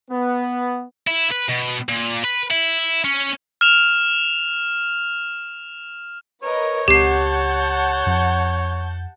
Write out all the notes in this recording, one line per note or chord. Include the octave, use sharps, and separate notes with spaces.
B3
E4
B4
B2
A#2
B4
E4
C#4
F6 E7 F7
A#4 B4 C#5 D#5
C#2 C4 G4 F#5 A5 G6 C7
F2